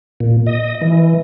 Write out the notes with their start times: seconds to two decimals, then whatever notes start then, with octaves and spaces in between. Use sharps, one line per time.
0.20 A#2
0.46 D#5
0.82 E3